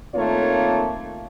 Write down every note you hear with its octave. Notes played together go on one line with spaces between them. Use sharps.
D#3 A3 A#3 C4 F4 C#5